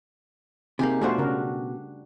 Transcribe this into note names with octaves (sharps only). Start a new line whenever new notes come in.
C3 A#3 D#4 G4 G#4
B2 G3 A3 D4 F4 F#4 C5
C#3 A#4